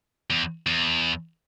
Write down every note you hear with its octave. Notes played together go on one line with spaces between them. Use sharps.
E2
E2